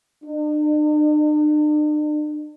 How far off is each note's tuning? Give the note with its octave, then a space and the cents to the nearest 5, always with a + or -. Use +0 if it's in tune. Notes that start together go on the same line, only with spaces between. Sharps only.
D4 +45